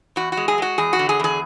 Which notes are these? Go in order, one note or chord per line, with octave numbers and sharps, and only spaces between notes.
E2 F#4
F#4
G#3
G#4
G#3 F#4
E2 G#4
F#4
D3
G#4
E2 G#4